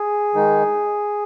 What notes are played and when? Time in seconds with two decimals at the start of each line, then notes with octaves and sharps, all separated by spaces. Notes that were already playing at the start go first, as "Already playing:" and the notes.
Already playing: G#4
0.34 D#3 G#3 D#4